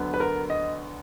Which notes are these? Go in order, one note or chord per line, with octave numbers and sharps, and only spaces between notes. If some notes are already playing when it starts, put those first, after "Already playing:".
Already playing: D2 D3 F#3 B3
B4
A#4
D#5